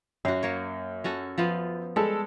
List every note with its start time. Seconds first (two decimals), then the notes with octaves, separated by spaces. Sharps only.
0.25 F#2 F#4 F5
0.43 A#3 C#5
1.04 C#4 F#4 A4
1.38 F3 B3 F4
1.96 G3 G#3 A4